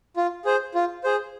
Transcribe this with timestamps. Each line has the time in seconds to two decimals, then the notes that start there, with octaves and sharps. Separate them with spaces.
0.17 F4
0.45 G#4 C5
0.74 F4
1.04 G#4 C5